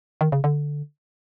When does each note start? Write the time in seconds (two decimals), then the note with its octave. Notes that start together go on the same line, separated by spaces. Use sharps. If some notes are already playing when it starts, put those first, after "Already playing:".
0.21 D#3
0.32 C#3
0.44 D3